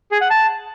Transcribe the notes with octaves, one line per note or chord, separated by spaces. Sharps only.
G#4
F#5
A5